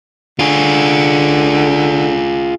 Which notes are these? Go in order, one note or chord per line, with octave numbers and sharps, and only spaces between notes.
D3 F4 G#4